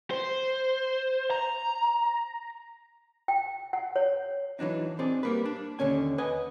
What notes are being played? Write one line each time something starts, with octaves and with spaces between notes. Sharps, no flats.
C5
A#5
G5
F#5
C#5
E3 F#3 D4 D#4
C4 D4 D#4 G#4 D5
G3 A#3 B4
D4
D#2 D3 C#4 G#5
B4 D#5 F#5 G#5